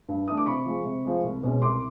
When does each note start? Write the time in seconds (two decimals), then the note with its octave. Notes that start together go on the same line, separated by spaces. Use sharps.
0.09 G2
0.28 E3 A3 D4 D#6
0.37 D6
0.46 C3 B5 C#6
0.65 F3 G#3
0.84 C3
1.05 F3 G#3
1.24 C2
1.43 B2 G#3 C#4
1.62 C2 C6 D6